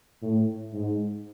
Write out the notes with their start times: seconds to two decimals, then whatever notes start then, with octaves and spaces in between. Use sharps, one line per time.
0.22 A2
0.74 G#2